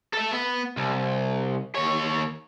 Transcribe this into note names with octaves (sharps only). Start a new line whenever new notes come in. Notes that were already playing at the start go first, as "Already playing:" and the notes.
A4 E5
B3
C2
D#2 C#5